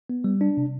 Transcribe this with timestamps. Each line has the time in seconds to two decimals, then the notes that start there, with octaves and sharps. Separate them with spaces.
0.09 B3
0.24 G3
0.41 D4
0.57 C3